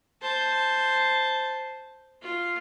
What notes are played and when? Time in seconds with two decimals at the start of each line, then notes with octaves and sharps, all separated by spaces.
0.22 C5 A5
2.22 F4